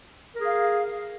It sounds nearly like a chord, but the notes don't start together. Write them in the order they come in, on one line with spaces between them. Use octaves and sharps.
A#4 G#4 F5